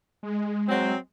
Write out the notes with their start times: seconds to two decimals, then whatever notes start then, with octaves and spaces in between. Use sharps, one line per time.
0.23 G#3
0.68 F#3 C4